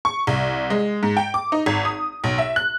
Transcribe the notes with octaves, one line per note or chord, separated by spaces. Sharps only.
C#6
C2
G#3
G#2
G5
D6
D#4
G#1
D#6
B1
E5
F#6